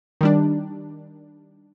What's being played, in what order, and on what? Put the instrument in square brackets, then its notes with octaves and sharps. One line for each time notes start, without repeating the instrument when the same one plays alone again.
[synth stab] D#3 G3 D4